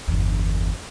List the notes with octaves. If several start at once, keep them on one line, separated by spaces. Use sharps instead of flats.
G1 E2